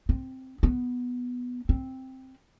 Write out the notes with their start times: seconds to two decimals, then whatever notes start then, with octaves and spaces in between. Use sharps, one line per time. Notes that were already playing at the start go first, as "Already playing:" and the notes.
0.09 C4
0.63 B3
1.69 C4